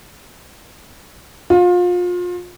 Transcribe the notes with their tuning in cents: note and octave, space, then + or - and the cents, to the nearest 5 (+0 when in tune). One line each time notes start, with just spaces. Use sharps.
F4 +30